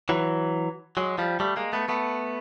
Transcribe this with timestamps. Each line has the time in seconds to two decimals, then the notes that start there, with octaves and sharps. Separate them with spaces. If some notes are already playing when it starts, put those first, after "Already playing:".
0.09 E3 F#3
0.97 F#3 G#3
1.18 F3 G3
1.40 G3 A3
1.56 G#3 A#3
1.73 A3 B3
1.89 A3 B3